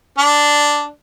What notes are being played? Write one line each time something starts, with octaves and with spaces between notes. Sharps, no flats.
D4